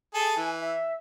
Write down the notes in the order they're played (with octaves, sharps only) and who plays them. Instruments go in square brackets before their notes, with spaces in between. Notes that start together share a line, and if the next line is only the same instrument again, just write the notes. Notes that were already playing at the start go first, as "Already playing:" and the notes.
[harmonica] G#4 A4 [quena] G#5
[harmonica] E3
[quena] E5